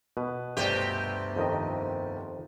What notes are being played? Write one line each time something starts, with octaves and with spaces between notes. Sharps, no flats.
B2 B4
G1 D2 C3 G4 D5
F2 D#3 D#5